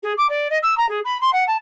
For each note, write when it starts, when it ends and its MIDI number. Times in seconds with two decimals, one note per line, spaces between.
0.03 0.12 68
0.17 0.26 86
0.29 0.47 74
0.50 0.58 75
0.62 0.77 88
0.77 0.87 82
0.88 0.99 68
1.04 1.20 83
1.20 1.30 84
1.32 1.44 78
1.47 1.56 81